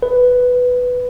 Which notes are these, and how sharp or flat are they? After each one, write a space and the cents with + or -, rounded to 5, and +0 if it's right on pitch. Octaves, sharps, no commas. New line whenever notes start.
B4 +5